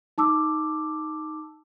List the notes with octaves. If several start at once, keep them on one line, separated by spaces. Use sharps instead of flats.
D#4 A5 D6 E6